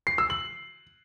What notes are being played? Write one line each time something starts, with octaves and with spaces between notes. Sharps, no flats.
C7
E6
F#7